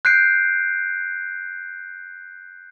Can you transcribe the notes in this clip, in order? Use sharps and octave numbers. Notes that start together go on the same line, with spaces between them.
F#6 G6 C7 D7